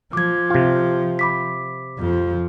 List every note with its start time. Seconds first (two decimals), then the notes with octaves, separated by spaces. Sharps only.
0.13 F3 D6 G#6
0.50 C3 F4
1.19 B5 D6 B6
1.99 F2 F3